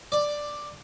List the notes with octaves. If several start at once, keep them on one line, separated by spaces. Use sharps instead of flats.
D5